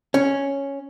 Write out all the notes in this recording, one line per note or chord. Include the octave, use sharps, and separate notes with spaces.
C#4